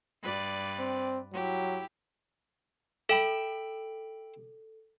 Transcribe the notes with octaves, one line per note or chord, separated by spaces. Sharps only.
G2 B4 D5
C4
F#3 E4 G4
A4 E5 G5 B5